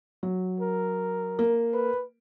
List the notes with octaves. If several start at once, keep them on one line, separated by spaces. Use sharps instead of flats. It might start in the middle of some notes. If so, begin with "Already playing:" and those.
F#3
A#4
A#3
B4